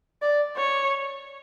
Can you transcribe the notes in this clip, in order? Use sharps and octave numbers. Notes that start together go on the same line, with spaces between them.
D5
C#5